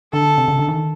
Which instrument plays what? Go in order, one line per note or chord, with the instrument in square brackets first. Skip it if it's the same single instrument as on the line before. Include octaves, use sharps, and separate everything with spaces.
[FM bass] D3 [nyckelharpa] A4
[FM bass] C3
C#3
D3
D#3